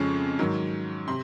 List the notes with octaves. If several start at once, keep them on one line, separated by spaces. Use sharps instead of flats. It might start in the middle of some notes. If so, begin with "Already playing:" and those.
Already playing: F2 C#3 F3 G#3 C#5 C#6
G#2 D#3 F#3
C3 C6